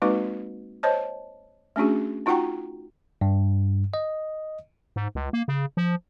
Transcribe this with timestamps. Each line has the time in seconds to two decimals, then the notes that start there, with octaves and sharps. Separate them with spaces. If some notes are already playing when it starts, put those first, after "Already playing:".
0.02 G#3 A#3 C4 D#4 F#4 B4
0.83 C5 C#5 D#5 A5
1.76 A3 C#4 D4 F#4 G#4
2.26 D#4 F4 F#4 F#5 G5 A#5
3.21 G2
3.94 D#5
4.96 G#2
5.15 C#2
5.33 A#3
5.48 C#3
5.77 F3